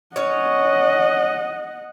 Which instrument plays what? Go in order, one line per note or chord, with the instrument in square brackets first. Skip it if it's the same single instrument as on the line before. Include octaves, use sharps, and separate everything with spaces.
[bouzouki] C#4 C#5 [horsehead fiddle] D#5 F#5